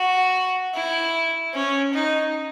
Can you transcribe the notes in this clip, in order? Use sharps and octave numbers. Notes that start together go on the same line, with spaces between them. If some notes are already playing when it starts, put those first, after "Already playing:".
Already playing: F#4
E4
C#4
D#4